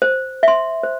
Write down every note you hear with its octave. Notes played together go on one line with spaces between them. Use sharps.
C5
E5 C6
C5